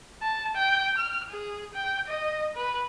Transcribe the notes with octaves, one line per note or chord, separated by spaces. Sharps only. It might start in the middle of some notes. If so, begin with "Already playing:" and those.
A5
G5
F6
G#4
G5
D#5
B4